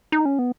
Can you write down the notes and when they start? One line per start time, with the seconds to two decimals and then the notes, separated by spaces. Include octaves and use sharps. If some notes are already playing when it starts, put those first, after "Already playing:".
0.12 D#4
0.25 C#4
0.39 B3